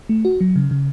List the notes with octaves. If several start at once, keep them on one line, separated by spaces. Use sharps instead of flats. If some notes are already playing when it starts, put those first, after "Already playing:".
A3
F#4
F#3
C#3
C#3